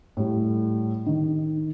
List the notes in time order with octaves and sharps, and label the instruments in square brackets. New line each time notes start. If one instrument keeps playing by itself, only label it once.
[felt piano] A2 G3
D#3